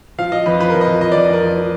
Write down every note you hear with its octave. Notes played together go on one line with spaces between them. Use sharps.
F3 F5
F3 D#5
F2 B4
F3 B4
A#4
F2
D#5
F3
F3 D#5
D5
F2
F2 A#4
F3
F3